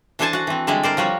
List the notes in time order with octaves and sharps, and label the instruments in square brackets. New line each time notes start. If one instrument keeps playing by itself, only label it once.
[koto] E3 D4 A4 C5 G#5 A5
F#4 F#5
E3 C4
D3 G3 G#3 E4
A#4 C5 D5
F3 G3 F#4 C#5